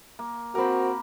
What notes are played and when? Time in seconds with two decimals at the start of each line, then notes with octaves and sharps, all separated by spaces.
0.19 A#3
0.55 A#3 C4 F#4 A#4 B5